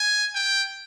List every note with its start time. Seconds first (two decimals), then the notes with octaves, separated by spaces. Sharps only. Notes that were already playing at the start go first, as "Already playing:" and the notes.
Already playing: G#5
0.35 G5